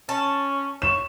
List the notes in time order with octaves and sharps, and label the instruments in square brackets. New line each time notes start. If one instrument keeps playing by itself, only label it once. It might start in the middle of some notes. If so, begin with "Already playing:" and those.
[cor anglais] C#4 [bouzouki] A5
[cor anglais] C#5 [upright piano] E7